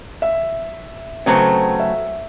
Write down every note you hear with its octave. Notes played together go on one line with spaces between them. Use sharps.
E5
C#3 F#3 A3 C4 B4 C5
E5